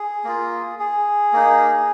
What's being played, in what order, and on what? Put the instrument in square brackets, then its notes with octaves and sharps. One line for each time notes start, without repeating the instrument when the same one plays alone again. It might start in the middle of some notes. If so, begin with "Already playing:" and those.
Already playing: [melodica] G#4
A#3 F4
G#4
A#3 D#4